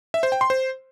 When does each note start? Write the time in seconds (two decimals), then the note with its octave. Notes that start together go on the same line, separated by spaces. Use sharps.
0.14 E5
0.23 C5
0.32 G5
0.41 C6
0.50 C5